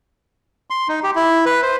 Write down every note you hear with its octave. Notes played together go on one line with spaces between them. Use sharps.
C6
D#4
G4
E4
B4
C5